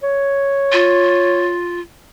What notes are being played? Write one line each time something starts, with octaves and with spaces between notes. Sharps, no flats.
C#5
F4